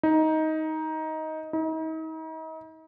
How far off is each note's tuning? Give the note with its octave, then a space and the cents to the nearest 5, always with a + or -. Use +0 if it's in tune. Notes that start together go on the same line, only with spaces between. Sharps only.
D#4 +15
D#4 +40